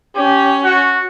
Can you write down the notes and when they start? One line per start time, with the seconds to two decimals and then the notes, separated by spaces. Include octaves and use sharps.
0.16 C#4 G4
0.64 F#4